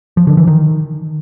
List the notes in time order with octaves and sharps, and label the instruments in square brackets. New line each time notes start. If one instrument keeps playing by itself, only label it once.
[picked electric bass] F3
D3
E3
D#3